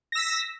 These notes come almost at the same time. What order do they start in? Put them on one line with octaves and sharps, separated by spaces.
A#6 E6 B6